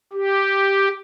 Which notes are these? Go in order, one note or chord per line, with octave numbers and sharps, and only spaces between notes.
G4